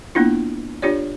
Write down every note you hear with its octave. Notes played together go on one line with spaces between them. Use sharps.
A#3 B3 D4 E4 F4
D4 F4 G4 C#5 D5